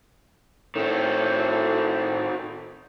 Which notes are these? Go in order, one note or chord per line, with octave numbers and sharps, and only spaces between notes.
A2 D#3 C4